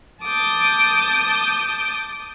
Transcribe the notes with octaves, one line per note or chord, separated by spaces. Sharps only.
A5 D6 D#6 G6